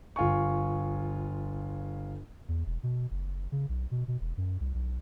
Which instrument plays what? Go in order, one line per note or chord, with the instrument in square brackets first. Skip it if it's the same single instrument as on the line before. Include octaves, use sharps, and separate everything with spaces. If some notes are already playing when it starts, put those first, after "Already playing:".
[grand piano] G1 F4 G#5 C#6
[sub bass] E2
E1
B2
F#1
C#3
B1
B2
B2
E1
F#2
C2
B1